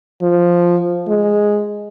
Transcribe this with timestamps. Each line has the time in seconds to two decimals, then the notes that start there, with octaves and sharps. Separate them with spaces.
0.22 F3
1.08 G#3